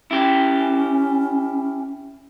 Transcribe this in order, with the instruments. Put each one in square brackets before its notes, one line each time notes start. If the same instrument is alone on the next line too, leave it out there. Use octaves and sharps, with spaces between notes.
[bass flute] C#4 [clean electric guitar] E4 G4